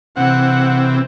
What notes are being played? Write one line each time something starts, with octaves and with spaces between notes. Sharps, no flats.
C3 E3 C4 F#5